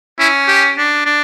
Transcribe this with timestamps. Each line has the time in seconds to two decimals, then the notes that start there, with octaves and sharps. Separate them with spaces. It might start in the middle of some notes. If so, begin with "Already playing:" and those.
0.19 C#4 E4
0.48 G4
0.77 D4
1.06 D4